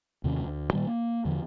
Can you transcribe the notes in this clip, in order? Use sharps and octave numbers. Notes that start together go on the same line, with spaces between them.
D#2 C3 D#3 C#4
D2
A#2 D#3 G3
A#3
E2 D3 F3